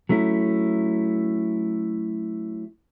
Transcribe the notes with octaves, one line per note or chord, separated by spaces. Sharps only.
F#3 A3 C#4 E4